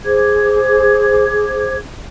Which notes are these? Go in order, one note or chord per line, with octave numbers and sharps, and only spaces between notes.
G#4 C5 D6 G#6